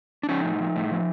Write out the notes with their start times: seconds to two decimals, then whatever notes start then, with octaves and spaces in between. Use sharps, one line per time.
0.23 D4
0.29 F3 C#4 D#4
0.44 A2
0.60 F3
0.76 A2
0.91 F3